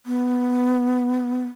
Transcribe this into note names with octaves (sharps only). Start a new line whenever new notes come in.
B3